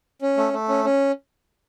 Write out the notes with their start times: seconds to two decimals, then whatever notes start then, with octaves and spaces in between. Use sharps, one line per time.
0.22 C#4
0.37 A3
0.53 A3
0.68 C#4
0.85 C#4